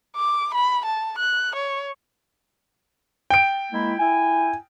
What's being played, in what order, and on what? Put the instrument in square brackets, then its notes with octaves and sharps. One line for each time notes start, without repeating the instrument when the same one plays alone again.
[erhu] D6
B5
A5
F#6
C#5
[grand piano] G5 D7
[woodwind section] G#3 A#3 E4
E4 G#5